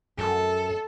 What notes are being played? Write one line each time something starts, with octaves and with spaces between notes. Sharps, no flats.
F#2 A4